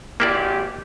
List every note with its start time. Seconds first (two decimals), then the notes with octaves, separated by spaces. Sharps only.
0.20 G#1 A#3 E4 G4 D5